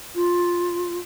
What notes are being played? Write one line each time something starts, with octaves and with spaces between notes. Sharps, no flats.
F4